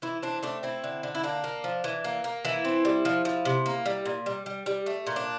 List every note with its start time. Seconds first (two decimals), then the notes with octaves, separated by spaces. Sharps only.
0.02 E3 E4
0.23 C4 D4
0.43 A3 D4
0.63 C4 E4
0.84 D3
1.03 D3
1.15 E4
1.23 A#3 D4
1.44 A#3
1.64 F3
1.84 E3
2.04 A#3
2.24 A#3
2.45 E3 E4
2.65 C4
2.85 G3
3.05 F3
3.25 F3
3.45 C3
3.66 A#3
3.86 G3
4.05 A#2
4.26 G3
4.46 G3
4.66 G3
4.86 A3
5.07 A#2
5.16 D4